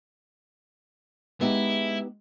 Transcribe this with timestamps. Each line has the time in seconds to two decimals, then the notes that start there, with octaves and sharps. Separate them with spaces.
1.41 G#3 B3 D#4 E4 G4